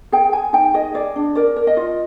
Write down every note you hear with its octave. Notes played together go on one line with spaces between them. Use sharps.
G#4 G5
G#4 G#5
D#4 G5
G#4 D#5
G#4 D5
D4
A#4 D5
A#4
D#5
F4